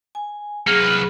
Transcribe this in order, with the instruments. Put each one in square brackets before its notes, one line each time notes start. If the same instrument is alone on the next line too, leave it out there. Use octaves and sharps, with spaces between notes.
[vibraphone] G#5
[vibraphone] F#3 G#4 [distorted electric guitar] A#3 C#4 [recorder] F6
[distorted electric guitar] C2 B4